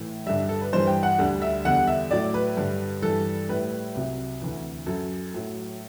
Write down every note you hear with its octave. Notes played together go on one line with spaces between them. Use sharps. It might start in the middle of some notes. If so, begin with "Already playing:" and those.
Already playing: A2 E3
G2 D3 G3 E5
E5
A4
B4
G2 E3 G3 C5
G5
F#5
D2 D3 G3
E5
E2 D3 G3 F#5
E5
A2 F#3 D5
B4
G2 D3 G3
G2 E3 G3 A4
A2 G3 B4
C2 C3 F#3
D2 C3 E3
F#2 F#3 A4
A2 F#3